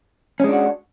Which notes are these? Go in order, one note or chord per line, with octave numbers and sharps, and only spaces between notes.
G#3 C#4 D4 F#4